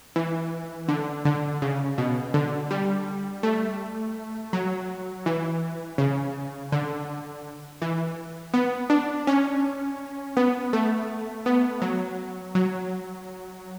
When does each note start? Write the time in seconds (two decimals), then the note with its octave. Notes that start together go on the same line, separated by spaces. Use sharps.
0.16 E3
0.88 D3
1.25 D3
1.62 C#3
1.98 B2
2.34 D3
2.71 G3
3.43 A3
4.53 F#3
5.26 E3
5.98 C#3
6.72 D3
7.82 E3
8.54 B3
8.90 D4
9.27 C#4
10.37 B3
10.73 A3
11.46 B3
11.82 F#3
12.55 F#3